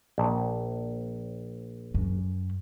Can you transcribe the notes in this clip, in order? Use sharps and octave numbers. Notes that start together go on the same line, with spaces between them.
A#1
F#2